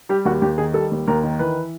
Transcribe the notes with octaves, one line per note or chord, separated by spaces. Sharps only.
G3 G4
D#2 F#4
D#2 G4
D#3 G#4
G3 A4
D#2
D#2 A#4
D#3
E3 B4